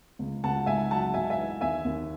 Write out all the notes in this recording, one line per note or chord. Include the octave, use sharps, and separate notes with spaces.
C#2
C#2 F#5 A5
G#2 E5 G#5
F#3 F#5 A5
G#2 E5 G#5
E5 G#5
E3
D#2 E5 G#5
D#2